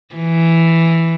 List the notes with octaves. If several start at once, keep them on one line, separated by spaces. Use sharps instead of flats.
E3